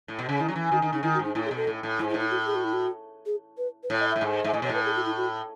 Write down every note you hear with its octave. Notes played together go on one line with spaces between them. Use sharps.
A2
B2
C#3
D#3 E4
F#3
E3
D#3 F#4
D#3 D#4
C#3 D#4
D#3 E4
F#4
G#2
D#4
A2 E4
G#4
B2
A4
A2
A2
G#2 E4
E4
A2
E4
F#4
G#4
F#4
E4
F#4
G#4
B4
B4
A2 C#5
D#5
A2 E5
G#2
G#2 E5
A2 D#5
B2 C#5
A2 B4
G#4
F#4
E4
F#4